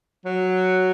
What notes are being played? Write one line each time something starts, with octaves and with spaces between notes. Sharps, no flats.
F#3